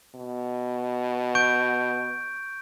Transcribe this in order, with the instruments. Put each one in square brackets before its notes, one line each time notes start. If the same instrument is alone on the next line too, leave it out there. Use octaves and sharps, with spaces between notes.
[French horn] B2
[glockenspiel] C#6 G6 D7